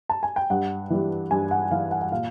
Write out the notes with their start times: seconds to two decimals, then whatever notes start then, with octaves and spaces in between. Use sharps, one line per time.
0.09 A5
0.23 G#5
0.36 G5
0.50 G2 F#5
0.90 E3 G3
1.31 G2 G#5
1.51 F#5
1.71 E3 G3 F5
1.91 F#5
2.01 F#5
2.12 A#2 F5